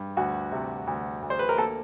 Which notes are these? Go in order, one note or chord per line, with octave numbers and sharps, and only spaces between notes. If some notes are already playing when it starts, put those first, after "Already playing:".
Already playing: G2
D2 F#4
C3
D2
D2
C5
B4
A#4
A#3 A4